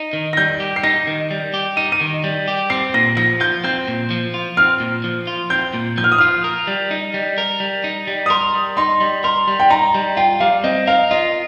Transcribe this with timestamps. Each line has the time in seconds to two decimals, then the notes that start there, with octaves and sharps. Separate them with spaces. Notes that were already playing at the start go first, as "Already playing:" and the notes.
Already playing: D#4
0.13 D#3
0.33 A#6
0.37 G3 G6
0.60 G4
0.76 C7
0.83 D#4 A#6
1.07 D#3
1.31 G3
1.54 G4
1.77 D#4 D#7
1.92 D#7
2.01 D#3
2.24 G3
2.48 G4
2.70 C4 C7
2.94 A#2 A#6
3.17 F3 A#6
3.40 F4 G6
3.64 C4 G6
3.88 A#2
4.11 F3
4.34 F4
4.57 C4 F6
4.80 A#2
5.04 F3
5.27 F4
5.50 C4 G6
5.74 A#2
5.97 F3 G6
6.04 F6
6.12 D#6
6.18 F4 F6
6.44 A#4
6.67 G3
6.91 D#4
7.14 G3
7.38 A#4
7.60 G3
7.84 D#4
8.07 G3
8.26 D#6
8.30 A#4 C6
8.54 G3
8.77 D#4 C6
9.00 G3
9.24 A#4 C6
9.47 G3
9.60 G5
9.70 D#4 A#5
9.94 G3
10.17 F4 G5
10.40 G3 F5
10.64 C4 D#5
10.87 A#4 F5
11.11 F4 D#5